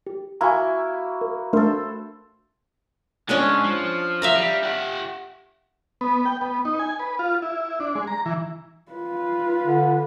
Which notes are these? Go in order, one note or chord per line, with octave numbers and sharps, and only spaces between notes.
G4
A#3 E4 F#4 G#5 A#5
A#4
A3 D4 A4 A#4 C5
G#2 G#3 C#4 D4 G#4
F3
E5 F5 A#5
G3
G4 F#5
B3
G5
B3
D#4
G#5
B4
F4
E4
D4
G#3
A#5
E3
F4 B4
D3